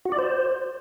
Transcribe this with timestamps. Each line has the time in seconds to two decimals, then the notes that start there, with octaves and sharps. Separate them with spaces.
0.05 F#4
0.12 D5
0.19 C5